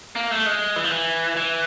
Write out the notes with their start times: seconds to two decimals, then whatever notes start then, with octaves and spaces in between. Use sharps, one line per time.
0.16 A#3
0.31 A3
0.46 G#3
0.76 E3
0.84 F3
0.92 E3
1.37 E3